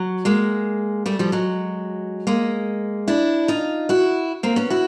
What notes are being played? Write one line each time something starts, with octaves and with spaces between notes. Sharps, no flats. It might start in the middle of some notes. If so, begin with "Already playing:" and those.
Already playing: F#3
G#3 A#3
G3 A3
F3 G3
F#3 G#3
G#3 A#3
D4 E4
D#4 F4
E4 F#4
A#3 C4
B3 C#4
E4 F#4